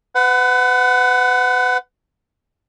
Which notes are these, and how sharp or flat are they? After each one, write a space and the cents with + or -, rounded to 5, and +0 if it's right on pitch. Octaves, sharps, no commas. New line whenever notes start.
B4 +35 F#5 +0